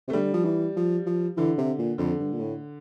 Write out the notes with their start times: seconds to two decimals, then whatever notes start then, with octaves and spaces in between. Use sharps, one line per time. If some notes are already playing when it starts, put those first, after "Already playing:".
0.08 C3 A3
0.13 D3 G3
0.33 F3
0.45 E3
0.76 F3
1.06 F3
1.37 D3 E3
1.58 C3
1.79 A#2
1.98 F2 D3
2.19 G2
2.32 A#2
2.39 A2